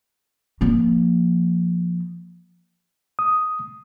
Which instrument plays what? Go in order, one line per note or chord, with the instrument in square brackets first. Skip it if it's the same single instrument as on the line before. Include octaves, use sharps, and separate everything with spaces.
[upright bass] F3 A#3
[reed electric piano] D#6